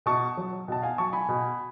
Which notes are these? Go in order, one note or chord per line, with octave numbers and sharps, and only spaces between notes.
B2 A5 C#6
F#3
B2 A5
F5 G#5
F#3 A5 C#6
G#5 B5
B2